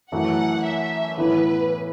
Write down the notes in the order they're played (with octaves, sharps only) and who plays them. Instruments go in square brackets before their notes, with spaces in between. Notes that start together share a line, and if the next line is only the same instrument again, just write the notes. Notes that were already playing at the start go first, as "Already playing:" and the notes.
[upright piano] F#2 E3 A3 F#4 [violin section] F#5
[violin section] E5
[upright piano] A2 E3 B3 E4 [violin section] B4